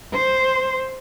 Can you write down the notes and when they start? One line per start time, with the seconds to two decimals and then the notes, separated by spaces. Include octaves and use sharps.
0.14 C5